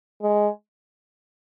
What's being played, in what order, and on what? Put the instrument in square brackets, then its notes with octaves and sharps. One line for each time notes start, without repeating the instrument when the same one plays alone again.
[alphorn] G#3